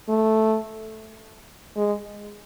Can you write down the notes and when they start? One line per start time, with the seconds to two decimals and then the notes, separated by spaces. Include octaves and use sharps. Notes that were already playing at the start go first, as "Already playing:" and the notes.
0.09 A3
1.77 G#3